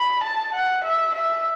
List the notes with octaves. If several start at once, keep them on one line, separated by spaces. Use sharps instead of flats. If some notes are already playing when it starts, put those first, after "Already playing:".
Already playing: B5
A5
F#5
E5
E5